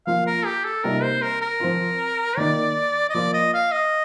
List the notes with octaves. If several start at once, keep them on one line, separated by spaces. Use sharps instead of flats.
F3 A#3 F4 F5
A#4
G4
A4
C3 G3 A#3 D#4 A#4
C5
A#4
A#4
F3 C4 F4
D#3 A#3 D#4 D5
D#5
F3 A#3 F4 D5
D#5
F5
D#5